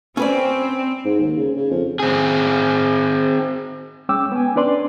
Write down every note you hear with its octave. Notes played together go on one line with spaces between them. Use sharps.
C4 C#4 B4 D5
G#2
D#2
C#3
C#3
F2
C4 G#4
G#3 C#4 G5 D6 E6
B3 G5 G#5
C#4 D4 B4 D5 C6